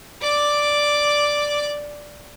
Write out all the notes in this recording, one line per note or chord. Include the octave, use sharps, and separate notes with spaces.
D5 D6